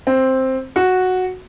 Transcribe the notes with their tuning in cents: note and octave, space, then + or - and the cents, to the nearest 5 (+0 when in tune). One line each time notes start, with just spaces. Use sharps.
C4 +5
F#4 -5